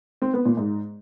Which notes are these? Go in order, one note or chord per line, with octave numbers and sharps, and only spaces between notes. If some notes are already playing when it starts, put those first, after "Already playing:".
C4
B3
A#2
G#2